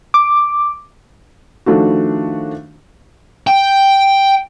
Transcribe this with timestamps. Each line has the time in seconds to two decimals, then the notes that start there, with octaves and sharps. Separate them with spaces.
0.14 D6
1.66 D#3 F3 A3 D4 F#4
3.47 G5